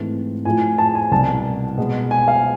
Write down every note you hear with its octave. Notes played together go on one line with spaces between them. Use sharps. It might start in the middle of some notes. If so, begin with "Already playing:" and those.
Already playing: G#2 E3 A3 C4
A2 F3 A3 G#5
A5
G#5
C2 B2 B3 A5
B2 G#3 B3
G#5
F5